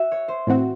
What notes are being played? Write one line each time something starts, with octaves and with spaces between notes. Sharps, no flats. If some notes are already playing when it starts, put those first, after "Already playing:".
Already playing: F#4 E5 F#5
C#5
C5
A2 E3 C4 F#4